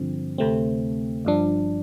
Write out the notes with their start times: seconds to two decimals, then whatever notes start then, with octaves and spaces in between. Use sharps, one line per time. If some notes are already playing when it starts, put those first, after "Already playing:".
Already playing: G2 D3 F3 C4
0.38 D2 C3 A3 C4
1.25 G1 G2 F3 D4